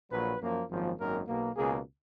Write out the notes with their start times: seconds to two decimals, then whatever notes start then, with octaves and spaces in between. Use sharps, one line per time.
0.11 A#1 A#2 F#3 B4
0.40 F#2 F3 A#3
0.69 G#1 F#2 F3 A#3
0.98 G#1 F#2 D#3 A#3 A#4
1.28 B1 B2 A#3
1.57 C#2 B2 A#3 G#4